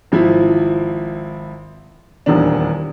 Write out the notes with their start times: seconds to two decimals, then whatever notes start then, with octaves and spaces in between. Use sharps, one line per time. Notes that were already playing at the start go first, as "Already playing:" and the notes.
0.12 G#1 F3 E4
2.26 D#1 E2 D#3 D4